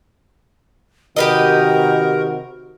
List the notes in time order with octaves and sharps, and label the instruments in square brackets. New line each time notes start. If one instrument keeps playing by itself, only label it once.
[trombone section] C3 D#3 F#4 [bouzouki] G4 B4 D#5 [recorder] A#4